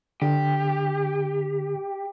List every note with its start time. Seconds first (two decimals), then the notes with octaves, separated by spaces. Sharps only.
0.22 D3 G4